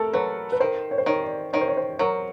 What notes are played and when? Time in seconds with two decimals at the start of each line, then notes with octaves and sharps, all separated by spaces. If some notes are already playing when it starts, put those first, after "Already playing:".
Already playing: A3 A4 A#4
0.13 F#3 B4
0.52 B4
0.60 D#3 C5
0.91 C#5
0.98 C5
1.06 D#3 C#5
1.23 D5
1.53 D#3 C#5
1.61 C5
1.68 C#5
1.77 C5
1.99 F#3 A#4